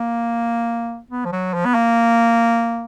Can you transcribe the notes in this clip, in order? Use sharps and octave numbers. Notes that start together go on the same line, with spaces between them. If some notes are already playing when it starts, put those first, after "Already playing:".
Already playing: A#3
B3
F3
F#3
F3
B3
A#3